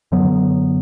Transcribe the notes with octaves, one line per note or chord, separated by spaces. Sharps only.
F#2 D3 F#3 B3